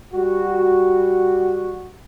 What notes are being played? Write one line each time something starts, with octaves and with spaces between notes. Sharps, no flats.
G3 F#4